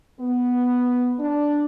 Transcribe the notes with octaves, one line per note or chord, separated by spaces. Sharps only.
B3
D4